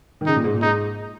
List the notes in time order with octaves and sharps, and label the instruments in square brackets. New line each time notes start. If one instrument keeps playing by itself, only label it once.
[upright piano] D#3
[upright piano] C#3 [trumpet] D#4
[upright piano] A#2
G#2
A#2
[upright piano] G#2 [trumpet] D#4